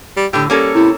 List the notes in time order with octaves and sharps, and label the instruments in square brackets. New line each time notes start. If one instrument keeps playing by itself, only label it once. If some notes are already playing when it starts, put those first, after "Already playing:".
[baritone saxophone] G3
[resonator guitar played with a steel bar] A2 D3 [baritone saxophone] G4
[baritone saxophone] G3 [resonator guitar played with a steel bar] A#3 C#4 A4
[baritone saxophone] C3 [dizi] E4